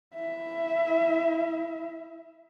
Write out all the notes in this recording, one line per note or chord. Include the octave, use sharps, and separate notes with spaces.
E4 E5